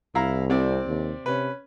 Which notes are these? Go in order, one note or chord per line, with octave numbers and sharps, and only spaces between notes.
C2 E4 F5 A#5
C3 C4 D5
D#2
C3 C#4 B4